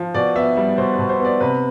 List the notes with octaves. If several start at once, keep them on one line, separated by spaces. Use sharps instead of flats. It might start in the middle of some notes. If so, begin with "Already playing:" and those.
Already playing: F3
B2 D5
B3 E5
G3 E5
B2 C5
B4
B2
C5
B3 D5
C3 B4